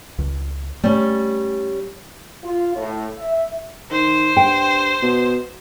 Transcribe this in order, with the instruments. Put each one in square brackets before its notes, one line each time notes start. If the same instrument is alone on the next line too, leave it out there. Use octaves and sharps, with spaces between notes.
[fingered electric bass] C#2
[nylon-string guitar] G3 C#4 [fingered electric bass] A3
[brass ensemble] F4
A2
E5
[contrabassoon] D#3 [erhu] C5
[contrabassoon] G2 [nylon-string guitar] G5
[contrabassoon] B2